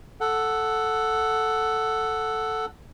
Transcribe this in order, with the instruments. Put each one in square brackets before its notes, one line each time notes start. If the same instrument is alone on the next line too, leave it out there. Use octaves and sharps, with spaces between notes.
[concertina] A4 F#5